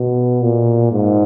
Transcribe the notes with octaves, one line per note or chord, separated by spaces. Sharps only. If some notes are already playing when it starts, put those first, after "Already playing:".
Already playing: B2
A#2
G#2